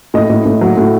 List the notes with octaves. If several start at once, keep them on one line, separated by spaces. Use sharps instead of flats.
A2 D#5
A2
A2
F#3
A2